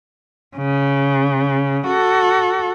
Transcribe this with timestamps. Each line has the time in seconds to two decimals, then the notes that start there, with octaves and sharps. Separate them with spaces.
0.56 C#3
1.87 F#4 A4